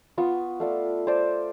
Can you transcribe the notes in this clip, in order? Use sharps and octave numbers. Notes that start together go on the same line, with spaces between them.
B3 F4 C#6 D#6
A3 F4 D5
C5 D5 A5